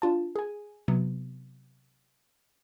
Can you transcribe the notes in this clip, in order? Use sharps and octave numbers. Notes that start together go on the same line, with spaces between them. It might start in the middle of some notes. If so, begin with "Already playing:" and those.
D4 F4 A5
G#4 G#5
C3 F#3 B3